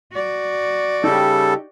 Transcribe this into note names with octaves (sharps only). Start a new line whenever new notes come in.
F#4 D5
C#3 G3 D#4 G4 A4